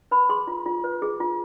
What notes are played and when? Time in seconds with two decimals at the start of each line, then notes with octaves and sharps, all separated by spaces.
0.11 B4 B5
0.29 G#4 C6
0.47 F4
0.66 F4
0.84 B4
1.02 G#4
1.20 F4